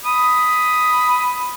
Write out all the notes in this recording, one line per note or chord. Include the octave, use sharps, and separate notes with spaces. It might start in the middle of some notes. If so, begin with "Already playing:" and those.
B5 D#6